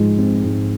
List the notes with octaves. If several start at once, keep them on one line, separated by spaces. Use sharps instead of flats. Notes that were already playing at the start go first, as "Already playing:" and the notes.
Already playing: G#2 F3 G#3
C4
G#2